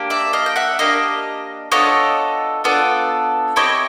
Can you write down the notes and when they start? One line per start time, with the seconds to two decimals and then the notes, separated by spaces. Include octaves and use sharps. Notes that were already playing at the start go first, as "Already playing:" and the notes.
Already playing: A#3 D4 G4
0.10 D5 E5
0.33 D#5 F5
0.46 G5
0.56 E5 F#5
0.79 A#3 D4 G4 D#5 F5
1.72 B3 D4 F4 A4 C#5 D#5
2.64 B3 D4 F4 A4
3.56 C4 E4 G4 C#5 D#5